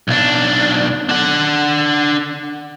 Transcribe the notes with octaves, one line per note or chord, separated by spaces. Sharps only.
B1 D4
D4 F#5